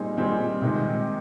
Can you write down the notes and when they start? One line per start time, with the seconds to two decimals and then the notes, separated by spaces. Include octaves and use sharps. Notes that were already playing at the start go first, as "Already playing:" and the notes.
Already playing: A#2 G3 C4 D#4 G#4
0.17 A#2 G3 C4 D#4 G#4
0.62 C3 D#3 G#3 D#4